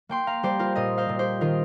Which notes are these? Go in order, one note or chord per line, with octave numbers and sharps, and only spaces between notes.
A#3 G5 C6
F5 A#5
G3 G4 C5
F4 A#4
A#2 A#4 D#5
C5 F5
A#2
G4 C5
D#3 F4 A#4